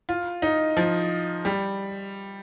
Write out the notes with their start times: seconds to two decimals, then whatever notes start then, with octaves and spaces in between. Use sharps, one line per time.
0.09 F4
0.42 D#4
0.77 F3
1.45 G3